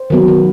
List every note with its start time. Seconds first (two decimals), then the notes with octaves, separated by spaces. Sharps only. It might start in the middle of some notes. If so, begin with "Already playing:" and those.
Already playing: C5
0.10 D#3 F#3 B3
0.28 D#3